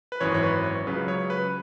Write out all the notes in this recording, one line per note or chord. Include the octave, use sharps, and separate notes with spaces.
B4
G#1 F#2 E3 C#5
C#5
B4
C#5
C#2 C#3 F#3 B4
C#5
B4